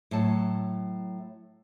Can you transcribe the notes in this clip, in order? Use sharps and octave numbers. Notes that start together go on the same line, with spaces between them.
A2 F#3 A5